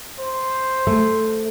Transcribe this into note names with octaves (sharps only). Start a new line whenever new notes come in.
C5
A3